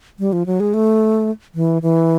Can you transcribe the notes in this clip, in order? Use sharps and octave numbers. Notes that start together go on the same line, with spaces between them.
G3
F3
F#3
G#3
A3
E3
E3